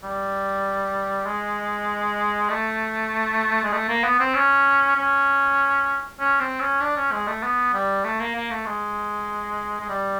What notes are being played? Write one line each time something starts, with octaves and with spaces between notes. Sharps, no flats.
G3
G#3
A3
G#3
A3
A#3
B3
C4
C#4
C#4
C#4
C4
C#4
D4
C#4
G#3
A3
B3
G3
A3
A#3
A#3
A3
G#3
G#3
G3